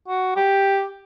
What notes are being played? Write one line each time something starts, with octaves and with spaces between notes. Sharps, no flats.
F#4
G4